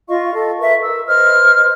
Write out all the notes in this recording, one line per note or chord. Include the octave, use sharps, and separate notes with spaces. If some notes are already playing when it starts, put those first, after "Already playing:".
F4 D#5 F5 C#6
A4 D#5
A#4 B4 E5 C#6
A#4 E6
B4 C5 D#5 F6